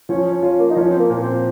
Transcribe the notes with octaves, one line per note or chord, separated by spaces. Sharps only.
F3 C#4
C#4
C#4 F4
A#3
D#4
F3 C#4
C4
A#3
A#2
C4